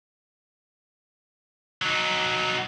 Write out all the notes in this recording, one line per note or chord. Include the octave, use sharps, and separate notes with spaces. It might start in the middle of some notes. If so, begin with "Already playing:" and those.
F#3 D#4